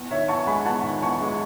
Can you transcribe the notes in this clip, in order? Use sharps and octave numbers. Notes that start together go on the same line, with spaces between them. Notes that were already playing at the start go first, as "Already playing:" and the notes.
Already playing: E2
D#3 C#5 E5
E2 A5 C#6
G#3 G#5 B5
E2 F#5 A5
D#3
E2 A5 C#6
G#3
C#6